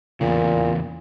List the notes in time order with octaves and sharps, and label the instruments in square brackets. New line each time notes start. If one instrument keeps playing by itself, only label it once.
[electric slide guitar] E2 C#3 [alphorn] A#2